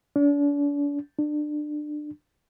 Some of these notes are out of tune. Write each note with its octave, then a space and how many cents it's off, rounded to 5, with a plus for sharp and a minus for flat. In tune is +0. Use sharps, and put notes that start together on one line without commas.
D4 -40
D4 +25